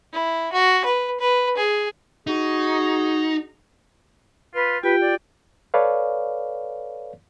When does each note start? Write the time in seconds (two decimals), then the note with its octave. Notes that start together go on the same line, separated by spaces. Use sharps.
0.12 E4
0.53 F#4
0.85 B4
1.20 B4
1.57 G#4
2.27 D#4 F#4 G#4
4.55 F4 B4
4.83 F4 G4 B4 G5
5.01 D5
5.74 A4 B4 C#5 D5 F5